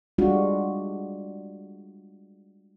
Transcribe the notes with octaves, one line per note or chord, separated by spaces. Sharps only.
G3 G#3 D4 F4 F#4